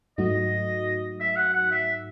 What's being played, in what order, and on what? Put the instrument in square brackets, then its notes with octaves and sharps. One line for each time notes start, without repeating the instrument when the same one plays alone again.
[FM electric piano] G#2 F#3 A3 D#4 F#4 [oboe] D#5
[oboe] E5
F#5
F#5
E5